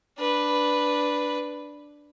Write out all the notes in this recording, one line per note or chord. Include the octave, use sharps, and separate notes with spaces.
D4 B4